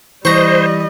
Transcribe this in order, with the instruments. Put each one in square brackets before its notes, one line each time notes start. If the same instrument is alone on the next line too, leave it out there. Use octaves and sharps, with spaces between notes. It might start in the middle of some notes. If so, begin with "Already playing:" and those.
[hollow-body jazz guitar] E3 [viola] G3 D#5 [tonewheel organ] C5 [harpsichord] A#5 C#6